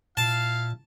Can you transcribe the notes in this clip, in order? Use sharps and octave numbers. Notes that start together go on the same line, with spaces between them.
A#2 E4 F5 A5